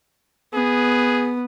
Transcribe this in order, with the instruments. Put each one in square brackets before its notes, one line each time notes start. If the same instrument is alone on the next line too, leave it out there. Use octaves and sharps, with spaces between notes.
[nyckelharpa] B3 [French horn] G#4